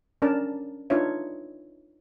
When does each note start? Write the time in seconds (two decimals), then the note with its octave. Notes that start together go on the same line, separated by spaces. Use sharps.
0.22 C#4 D4 A#4 D5 A5
0.90 D4 D#4 F4 B4 C#5 E5